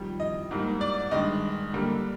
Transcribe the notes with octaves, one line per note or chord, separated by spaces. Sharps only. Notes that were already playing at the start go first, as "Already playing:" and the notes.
Already playing: F2 D#3 G3
D#5
G#2 G3 A#3
D5
G2 D#3 G#3 D#5
D3 G3 A#3